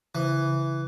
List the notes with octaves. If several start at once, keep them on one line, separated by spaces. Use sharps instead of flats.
C#3 E3